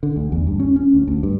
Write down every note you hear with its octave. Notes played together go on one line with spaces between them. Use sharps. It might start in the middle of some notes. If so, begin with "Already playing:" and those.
D3
D2
E2
G2
C#4
C#4
D2
D2
G2